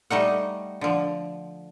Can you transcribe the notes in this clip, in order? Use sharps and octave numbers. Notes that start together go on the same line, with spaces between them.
G3 A3 D#4 F#5
D3 F3